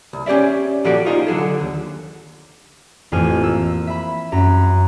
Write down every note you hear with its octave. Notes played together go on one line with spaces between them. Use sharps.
C2
C#4 G4 G#4 D5 E5
A#2 F3 F#4 G4 A4 D5
D#4 F4 G#4 C5
D3 F#3 G#4 A4
D#2
A1 F2 C5 G#5 F6 D#7
A#3 E6
E5 B5
F#2 A#5